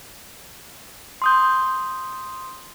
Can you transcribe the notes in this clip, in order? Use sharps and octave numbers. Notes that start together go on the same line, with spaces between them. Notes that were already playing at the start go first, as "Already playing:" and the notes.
C6 D#6 G6